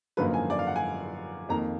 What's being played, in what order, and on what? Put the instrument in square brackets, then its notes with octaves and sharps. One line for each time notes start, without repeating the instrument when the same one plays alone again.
[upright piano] G#1 F#2 D3 F3 A#3 B4
G#5
D5
F5
F#5
G#5
F2 D#3 A#3 A#5